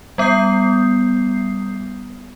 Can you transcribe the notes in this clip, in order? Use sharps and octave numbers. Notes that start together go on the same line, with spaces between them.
G3 B3 D#6 G6 C7